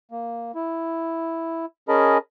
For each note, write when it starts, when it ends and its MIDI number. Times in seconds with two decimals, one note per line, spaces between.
0.11 0.52 58
0.55 1.66 64
1.89 2.18 61
1.89 2.18 68
1.89 2.18 70
1.89 2.18 75
1.89 2.18 81
1.89 2.18 83